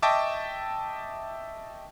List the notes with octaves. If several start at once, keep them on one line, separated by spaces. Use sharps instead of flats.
D#5 E5 G5 A5 C#6 D6